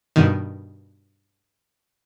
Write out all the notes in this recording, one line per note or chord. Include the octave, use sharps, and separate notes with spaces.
G2 B2 D#3